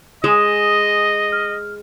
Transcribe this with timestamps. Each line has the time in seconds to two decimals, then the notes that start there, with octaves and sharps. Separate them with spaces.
0.24 G#3 D#5 G#5 D#6 E7
1.32 F6